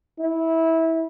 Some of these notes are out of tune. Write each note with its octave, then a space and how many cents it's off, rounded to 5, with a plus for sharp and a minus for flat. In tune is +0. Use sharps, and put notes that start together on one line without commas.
E4 -20